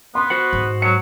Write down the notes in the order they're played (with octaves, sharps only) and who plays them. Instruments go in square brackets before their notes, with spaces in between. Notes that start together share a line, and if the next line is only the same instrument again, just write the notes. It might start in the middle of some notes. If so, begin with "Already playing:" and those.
[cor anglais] B3 [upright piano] C6
[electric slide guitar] F#4 C5 F#5
[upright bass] G#2
[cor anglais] F#3 [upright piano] C#7